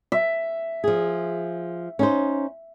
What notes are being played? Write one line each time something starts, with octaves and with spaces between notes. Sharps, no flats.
E5
F3 G#4
C#4 D#4 C5